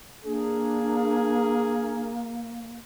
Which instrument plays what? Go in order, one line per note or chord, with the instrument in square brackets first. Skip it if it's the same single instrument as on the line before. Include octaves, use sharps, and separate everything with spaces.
[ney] A#3 [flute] D4 [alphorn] G#4